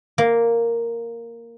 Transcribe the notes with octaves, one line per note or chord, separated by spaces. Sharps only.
A#3